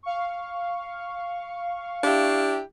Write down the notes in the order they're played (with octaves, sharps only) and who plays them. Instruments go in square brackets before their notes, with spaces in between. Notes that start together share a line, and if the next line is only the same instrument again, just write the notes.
[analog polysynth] F5 C#6
[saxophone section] D4 E4 G4